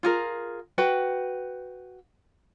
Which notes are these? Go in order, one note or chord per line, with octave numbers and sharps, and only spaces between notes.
F4 G#4 A#4
F#4 B4 G5